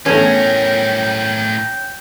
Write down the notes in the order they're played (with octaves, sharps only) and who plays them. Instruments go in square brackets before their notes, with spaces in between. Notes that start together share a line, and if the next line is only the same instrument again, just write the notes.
[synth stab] E2 A3 [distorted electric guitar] A2 A#4 [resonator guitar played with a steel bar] C#4 [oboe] G5